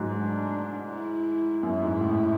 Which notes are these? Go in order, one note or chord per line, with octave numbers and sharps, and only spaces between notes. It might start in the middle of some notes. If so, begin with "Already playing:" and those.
Already playing: G#2 F#3 G#3
D4
E4
F#2 E4
G#2
A2